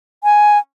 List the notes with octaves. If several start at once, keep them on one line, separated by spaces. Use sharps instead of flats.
G#5